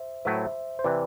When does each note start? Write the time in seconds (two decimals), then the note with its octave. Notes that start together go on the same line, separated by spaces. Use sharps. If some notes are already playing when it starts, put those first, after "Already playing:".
Already playing: C5 E5
0.25 A2 F#3 A3 E4 B4 C5 E5
0.79 C5
0.84 C3 E3 B4 D5